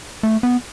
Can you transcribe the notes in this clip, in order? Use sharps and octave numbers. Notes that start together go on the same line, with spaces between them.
A3
B3